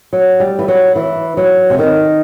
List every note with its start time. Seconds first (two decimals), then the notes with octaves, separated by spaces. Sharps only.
0.13 F#3
0.40 G3
0.59 E3
0.68 F#3
0.96 E3
1.37 F#3
1.70 C3
1.79 D#3